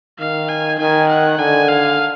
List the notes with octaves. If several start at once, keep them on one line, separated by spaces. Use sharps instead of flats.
D#3 F5
G#5
D#3 G#5
F#5
D3 G#5
F5